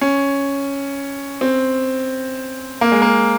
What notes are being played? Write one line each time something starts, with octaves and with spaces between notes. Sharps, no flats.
C#4
C4
A#3
G#3
A#3